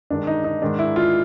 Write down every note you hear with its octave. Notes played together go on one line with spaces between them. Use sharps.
G2 D#3 G#3 D4
D#4
D#4
G#2 D#3 G#3 D4
E4
F4